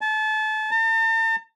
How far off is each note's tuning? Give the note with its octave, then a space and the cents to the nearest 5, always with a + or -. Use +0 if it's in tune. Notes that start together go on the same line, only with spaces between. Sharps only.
A5 -30
A5 +45